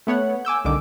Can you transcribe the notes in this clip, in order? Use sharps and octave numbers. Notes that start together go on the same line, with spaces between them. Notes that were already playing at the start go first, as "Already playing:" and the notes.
A3 B3 C#5 F#5
G#5 D6 E6 G6
C2 D3 D#3 D6